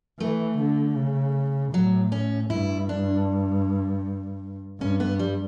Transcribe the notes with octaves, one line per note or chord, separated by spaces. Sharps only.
E3 A3
D3
C#3
A2 F#3
C#4
G2 E4
D4
G2 C#4
B3
G3